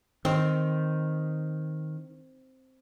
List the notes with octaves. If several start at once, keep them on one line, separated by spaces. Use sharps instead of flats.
D#3 C4